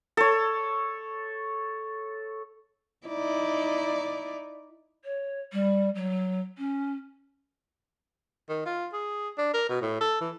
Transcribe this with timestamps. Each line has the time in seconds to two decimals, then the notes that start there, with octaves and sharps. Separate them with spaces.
0.17 A4 C#5
3.07 D#4 E4 D5
5.05 C#5
5.53 G3
5.95 F#3
6.58 C#4
8.49 D#3
8.66 F4
8.93 G#4
9.38 D4
9.54 A#4
9.69 B2
9.82 A2
10.01 A4
10.21 E3